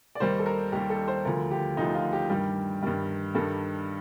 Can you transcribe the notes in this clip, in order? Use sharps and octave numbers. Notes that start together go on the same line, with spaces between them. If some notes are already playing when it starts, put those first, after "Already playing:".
D5
D#2 D#3 G3 C5
A4
A#4
D#2 D#3 G3 G4
A4
C5
D2 D3 F3 A#4
G4
D2 D3 F3 D#4
F4
G4
G2 D#3 G3 G4
G2 D#3 G3
G2 D#3 G3 A4